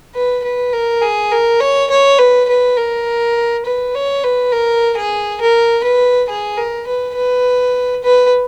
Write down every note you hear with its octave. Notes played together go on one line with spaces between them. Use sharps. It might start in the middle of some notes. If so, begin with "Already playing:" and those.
B4
B4
A#4
G#4
A#4
C#5
C#5
B4
B4
A#4
B4
C#5
B4
A#4
G#4
A#4
B4
G#4
A#4
B4
B4
B4